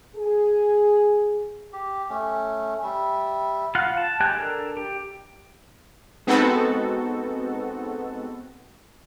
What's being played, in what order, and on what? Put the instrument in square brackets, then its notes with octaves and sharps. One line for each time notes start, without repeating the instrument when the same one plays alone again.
[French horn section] G#4
[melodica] G4
A3 C#4
G3 E5
[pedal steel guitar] F4 F5 F#5
A5
G#3 G4 G5 G#5 F#6
D4 A4 A#4
G4
[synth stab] G#3 B3 C4 D#4 F#4 A4